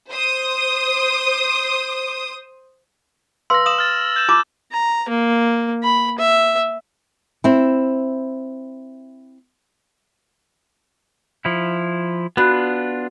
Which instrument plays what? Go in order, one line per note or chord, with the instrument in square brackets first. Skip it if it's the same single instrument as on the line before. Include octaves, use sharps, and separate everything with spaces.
[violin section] C5 D#6
[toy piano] B4 F5 C6 [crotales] E6 A#6
[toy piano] F5 D#6 [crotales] E7 F#7
[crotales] F6 A6
G6 E7
[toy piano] F4 A5 D6
[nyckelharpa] A#5
A#3
B5
E5
[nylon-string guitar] C4 E4
[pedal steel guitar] F3 E4
[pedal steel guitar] B3 D4 F4 [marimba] F#4 B5 F#6